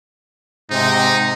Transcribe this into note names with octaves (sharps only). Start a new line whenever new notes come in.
G#2 C3 D#4